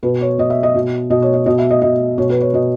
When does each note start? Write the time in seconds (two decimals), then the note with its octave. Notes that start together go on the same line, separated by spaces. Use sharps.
0.03 B2 B4
0.21 C#5
0.38 B2 D#5
0.50 E5
0.63 D#5
0.74 B2
1.10 B2 D#5
1.22 C#5
1.34 D#5
1.46 B2 D#5
1.58 E5
1.71 D#5
1.82 B2 D#5
2.18 B2 C#5
2.30 B4
2.41 C#5
2.53 B2 D#5